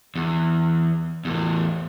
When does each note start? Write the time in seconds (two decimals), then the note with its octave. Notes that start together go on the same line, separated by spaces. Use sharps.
0.16 E2
1.25 E2 A2